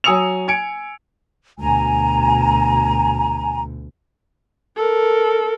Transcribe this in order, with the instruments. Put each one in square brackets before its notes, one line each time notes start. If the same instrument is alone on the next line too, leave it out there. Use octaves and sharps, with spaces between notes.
[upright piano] F#3 G#5 D#6 E6 C#7 F7
G#5 G#6 C#7 D7
[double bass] D2 B2 [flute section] G#5 A#5
[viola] A4 A#4